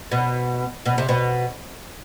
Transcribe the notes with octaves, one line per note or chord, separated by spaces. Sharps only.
B2
B2
C3
B2